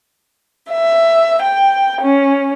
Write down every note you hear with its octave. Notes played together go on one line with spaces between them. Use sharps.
E5
G5
C#4